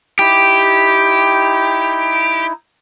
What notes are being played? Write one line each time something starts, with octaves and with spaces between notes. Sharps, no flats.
D#4 E4 G4